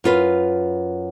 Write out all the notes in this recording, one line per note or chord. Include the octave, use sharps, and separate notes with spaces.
F#2 F4 B4